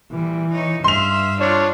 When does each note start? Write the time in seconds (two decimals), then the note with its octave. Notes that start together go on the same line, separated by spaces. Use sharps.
0.11 A#2 E3 G3
0.51 D#4 C#5
0.84 G2 E5 F5 C6 F7
1.41 D4 F4 C#5